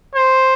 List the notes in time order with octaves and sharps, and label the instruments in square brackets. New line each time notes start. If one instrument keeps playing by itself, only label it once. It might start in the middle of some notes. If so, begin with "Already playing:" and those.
[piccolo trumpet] C5